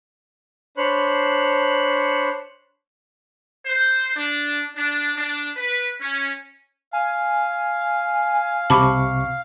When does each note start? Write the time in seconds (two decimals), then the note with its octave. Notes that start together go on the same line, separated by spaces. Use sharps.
0.77 D4 C5 C#5 B5 F#6
3.65 C5
4.15 D4
4.76 D4
5.16 D4
5.57 B4
6.01 C#4
6.93 F5 G#5
8.70 C2 C3 A5 B5 C#6 D6